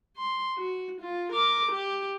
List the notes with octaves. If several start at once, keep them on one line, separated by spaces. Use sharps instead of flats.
C6
F#4
F4
A#4 D6
G4